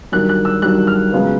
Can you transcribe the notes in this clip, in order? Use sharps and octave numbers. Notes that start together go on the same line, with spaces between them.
G2 D#3 F#3 F#6
F#6
E6
G2 D#3 F#3 F#6
F6
C#2 C#3 F#3 B3